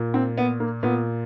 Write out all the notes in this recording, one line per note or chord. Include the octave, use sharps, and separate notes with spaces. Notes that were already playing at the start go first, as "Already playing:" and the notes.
Already playing: A#2
C4
B3
A#3
A#2 B3